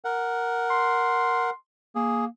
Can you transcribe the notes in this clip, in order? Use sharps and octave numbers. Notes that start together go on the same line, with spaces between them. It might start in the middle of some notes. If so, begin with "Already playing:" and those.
A#4 F#5
C6
A#3 G#4